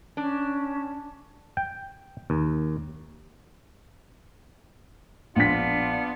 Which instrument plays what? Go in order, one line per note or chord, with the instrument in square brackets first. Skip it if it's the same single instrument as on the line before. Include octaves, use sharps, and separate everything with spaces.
[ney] C#4 [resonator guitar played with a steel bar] D4
[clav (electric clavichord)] G5
D#2
[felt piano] A#1 B6 [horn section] B3 D4 F4